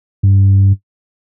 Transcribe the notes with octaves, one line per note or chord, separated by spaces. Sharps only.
G2